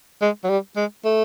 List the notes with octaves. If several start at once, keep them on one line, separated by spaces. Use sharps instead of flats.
G#3
F#3
G3
G#3
A3